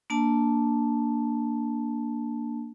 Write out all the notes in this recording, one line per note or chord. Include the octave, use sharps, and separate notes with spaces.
A#3 D4 A5